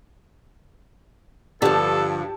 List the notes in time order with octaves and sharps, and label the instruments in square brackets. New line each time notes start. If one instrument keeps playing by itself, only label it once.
[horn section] G2 [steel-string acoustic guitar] D3 F3 [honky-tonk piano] G4 A5 [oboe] A4